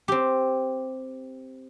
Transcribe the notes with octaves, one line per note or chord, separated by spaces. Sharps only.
C4 G4